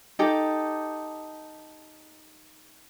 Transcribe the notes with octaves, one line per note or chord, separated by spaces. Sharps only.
D#4 G4 A4